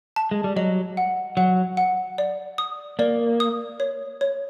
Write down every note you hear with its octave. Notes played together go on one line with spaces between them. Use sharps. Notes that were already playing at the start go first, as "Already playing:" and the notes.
A5
G#3
G3
F#3 D#5
F#5
F#3 F#5
F#5
D5
D#6
A#3 D5
D#6
C#5
C#5